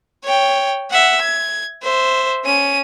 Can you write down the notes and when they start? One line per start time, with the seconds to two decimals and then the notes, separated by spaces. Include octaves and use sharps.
0.24 C#5 G5
0.90 E5 F#5
1.21 G#6
1.82 C5 E5
2.45 C#4 D#7